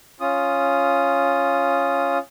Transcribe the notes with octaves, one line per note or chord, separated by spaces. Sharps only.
C#4 F4 D#6